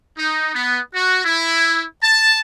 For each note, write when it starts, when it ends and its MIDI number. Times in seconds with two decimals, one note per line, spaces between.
0.18 0.53 63
0.54 0.79 59
0.95 1.24 66
1.25 1.83 64
2.03 2.39 81